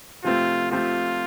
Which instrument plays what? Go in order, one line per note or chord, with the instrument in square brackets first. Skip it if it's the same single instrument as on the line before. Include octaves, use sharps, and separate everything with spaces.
[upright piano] C3 F3 A3 C4 [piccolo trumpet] F4
[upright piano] F3 A3 C4 G4 [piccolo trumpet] F4